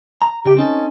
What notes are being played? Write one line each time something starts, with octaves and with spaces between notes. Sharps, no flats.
A#5
C#3 G4 G5
C4 C#4 D#4 A4